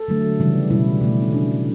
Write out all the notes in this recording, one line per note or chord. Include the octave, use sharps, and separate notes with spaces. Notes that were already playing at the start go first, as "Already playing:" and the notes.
Already playing: A4
D3 F#3 A3
C#3 E3 G3
B2 G3 E4
B2 A3
C#4
C#3 G3 D4